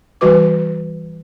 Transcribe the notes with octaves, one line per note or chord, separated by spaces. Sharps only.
E3 G3 F#4 B4 D6